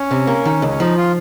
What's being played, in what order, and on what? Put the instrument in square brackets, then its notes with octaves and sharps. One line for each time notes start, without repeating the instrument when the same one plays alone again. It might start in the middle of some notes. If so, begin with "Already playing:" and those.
Already playing: [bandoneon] C#4
[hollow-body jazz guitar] C3
A#3
D#3
C#2
[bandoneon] C#4
[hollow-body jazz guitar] F3 [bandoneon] D#4
[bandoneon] F4